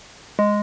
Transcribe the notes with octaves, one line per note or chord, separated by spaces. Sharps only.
G#3